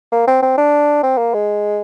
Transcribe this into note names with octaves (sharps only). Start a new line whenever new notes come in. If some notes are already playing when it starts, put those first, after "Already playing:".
A#3
C4
C4
D4
C4
A#3
G#3